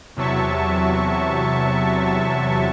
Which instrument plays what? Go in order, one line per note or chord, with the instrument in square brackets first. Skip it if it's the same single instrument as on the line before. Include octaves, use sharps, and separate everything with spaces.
[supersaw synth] E2 C3 F#3 E5 A5 C#6